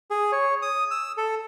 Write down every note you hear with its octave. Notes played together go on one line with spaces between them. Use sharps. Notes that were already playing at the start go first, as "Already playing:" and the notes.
G#4
C#5
D#6
E6
A4